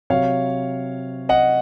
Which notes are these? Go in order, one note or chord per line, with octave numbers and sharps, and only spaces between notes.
C3 F#3 C4 C#5 F5
D#5 F#5